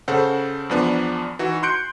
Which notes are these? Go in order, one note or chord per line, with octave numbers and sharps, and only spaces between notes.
C#3 A4 C5 F#5
E2 F3 B3 D4
E3 D#4 F#4
C6 F#6 G6 C#7 D7